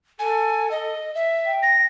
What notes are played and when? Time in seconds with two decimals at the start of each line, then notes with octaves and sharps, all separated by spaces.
0.19 A4 G#5
0.71 D#5
1.15 E5
1.45 G5
1.63 A#6